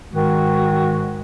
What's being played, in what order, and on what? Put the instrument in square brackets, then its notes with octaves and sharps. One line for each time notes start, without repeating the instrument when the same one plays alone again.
[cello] G#2 [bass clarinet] D#3 [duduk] F#4